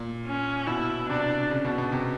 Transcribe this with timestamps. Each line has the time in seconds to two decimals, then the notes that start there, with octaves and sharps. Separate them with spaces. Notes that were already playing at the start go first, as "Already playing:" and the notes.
Already playing: A#2
0.26 C#4
0.67 B2 E4
1.09 C3 D4
1.51 C#3
1.65 B2
1.78 B2
1.92 C3